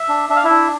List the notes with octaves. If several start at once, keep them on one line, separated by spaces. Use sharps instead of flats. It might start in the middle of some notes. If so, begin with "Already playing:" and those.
Already playing: E5
D4
D4 E5
F5
E4 E5
D4